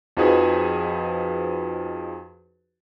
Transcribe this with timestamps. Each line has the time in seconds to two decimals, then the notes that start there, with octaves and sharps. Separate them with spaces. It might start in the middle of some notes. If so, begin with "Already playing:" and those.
0.17 F2 F3 D#4 F#4 G#4 B4